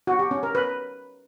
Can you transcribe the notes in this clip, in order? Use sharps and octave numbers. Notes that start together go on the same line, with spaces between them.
F#4
G4
C#4
A#4
B4